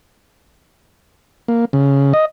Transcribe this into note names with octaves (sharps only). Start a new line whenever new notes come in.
A#3
C#3
D#5